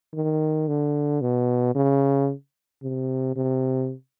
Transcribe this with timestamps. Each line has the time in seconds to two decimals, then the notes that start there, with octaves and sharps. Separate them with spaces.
0.14 D#3
0.68 D3
1.21 B2
1.75 C#3
2.82 C3
3.36 C3